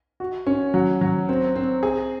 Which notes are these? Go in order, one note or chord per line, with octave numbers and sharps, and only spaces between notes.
F#4
C#4
F#3
F#3
C4
C4
G#4